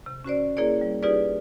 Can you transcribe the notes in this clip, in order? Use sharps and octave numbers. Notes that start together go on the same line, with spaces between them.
C3
C#4 F#4 C5 D5
A#3 E4 G#4 A#4 C#5 D5
G3
D#4 F4 G4 G#4 B4 D5